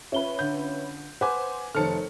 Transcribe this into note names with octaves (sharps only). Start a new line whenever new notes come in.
C#4 F4 B4 E5 G7
D3 G6
B4 C5 F#5 G#5 D6
F1 D#3 A4 C5 C#5 A5 F6 C#7